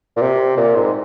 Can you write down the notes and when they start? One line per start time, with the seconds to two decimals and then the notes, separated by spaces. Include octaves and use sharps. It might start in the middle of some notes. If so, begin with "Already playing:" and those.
0.17 A#2
0.22 C3
0.57 A#2
0.76 G#2